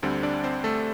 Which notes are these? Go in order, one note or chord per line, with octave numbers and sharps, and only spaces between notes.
D2 D3 G3 C4
D4 D5
C4 C5
A3 A4